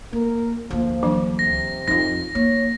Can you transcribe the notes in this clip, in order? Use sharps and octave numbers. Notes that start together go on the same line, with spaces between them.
A#3 A#4
D2 F3 A#3
E3 F#3 D4
C3 A#6
F2 D#4 F4 A#6
A#3 C#5